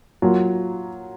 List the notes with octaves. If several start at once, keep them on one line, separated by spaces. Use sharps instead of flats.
F#3 A#3 F4